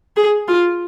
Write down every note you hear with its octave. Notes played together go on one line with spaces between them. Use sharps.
G#4
F4